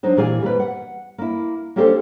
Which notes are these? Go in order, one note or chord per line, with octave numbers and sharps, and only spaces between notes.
F#3 D4 D#4 C5
A#2 E3 G4 G#4 F5 G#5
G3 A#3 C4 B4
F#5
A#3 E4
A#3 C#4 D4 G4 A4 C5